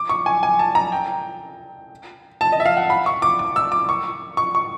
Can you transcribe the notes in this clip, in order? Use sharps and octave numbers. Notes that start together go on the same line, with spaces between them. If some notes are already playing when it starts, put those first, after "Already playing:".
Already playing: D6
C#6
G#5
G#5
A5
A#5
G5
A5
D#5
E5
F5
F#5
B5
C#6
D6
D6
E6
D6
C#6
C#6
C#6